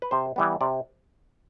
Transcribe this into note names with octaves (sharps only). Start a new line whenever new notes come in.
B4
C3 C5
E3 G3 B3
C3 D5